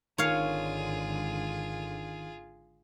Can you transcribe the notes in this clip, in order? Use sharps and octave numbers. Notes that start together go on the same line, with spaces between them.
G#1 D3 D#3 F4 G#4 C#5 F5